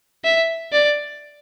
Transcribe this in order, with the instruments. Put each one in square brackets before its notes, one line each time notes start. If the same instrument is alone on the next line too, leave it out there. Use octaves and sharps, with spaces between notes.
[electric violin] E5
D5